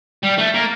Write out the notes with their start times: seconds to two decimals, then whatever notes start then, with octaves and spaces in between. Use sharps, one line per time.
0.23 G3
0.38 A3
0.54 A#3